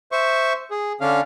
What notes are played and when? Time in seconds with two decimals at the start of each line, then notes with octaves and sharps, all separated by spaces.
0.12 C5 E5 C#6
0.71 G#4
1.01 D3 C#4 D4 F5